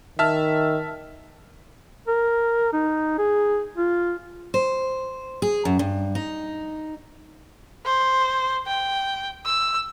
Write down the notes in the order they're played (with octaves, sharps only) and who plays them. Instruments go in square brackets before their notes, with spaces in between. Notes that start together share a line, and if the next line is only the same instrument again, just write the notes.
[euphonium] D#3 [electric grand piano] E5 A5 F6
[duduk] A#4
D#4
G#4
F4
[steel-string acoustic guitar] C5
G#4
F#2
G2
D#4
[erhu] C5
G5
E6